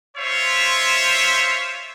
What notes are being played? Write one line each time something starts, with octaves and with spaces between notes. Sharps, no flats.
F4 C5 C#5 E5